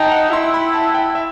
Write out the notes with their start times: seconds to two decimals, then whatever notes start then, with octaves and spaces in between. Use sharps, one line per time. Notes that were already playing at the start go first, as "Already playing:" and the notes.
Already playing: D#4 G5 A5
0.12 F#5
0.33 E4 C6
0.54 B5
0.74 A5
0.94 G5
1.15 E5